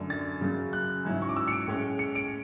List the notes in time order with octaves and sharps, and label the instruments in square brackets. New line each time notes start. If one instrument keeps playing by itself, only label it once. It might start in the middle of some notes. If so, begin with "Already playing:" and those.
Already playing: [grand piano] F#2 D3 A3
A6
F#2 C#3 F#3
F#6
G#2 F#3 C#4 E4
C#6
D6
E6
C#7
D7
A2 G#3 C#4
C#7
D7